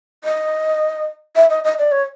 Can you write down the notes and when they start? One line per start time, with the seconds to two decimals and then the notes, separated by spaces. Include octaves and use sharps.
0.24 D#5
1.36 E5
1.50 D#5
1.64 D#5
1.79 D5
1.92 C#5